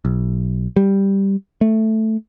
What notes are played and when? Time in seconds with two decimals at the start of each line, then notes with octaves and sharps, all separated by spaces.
0.05 B1
0.76 G3
1.61 A3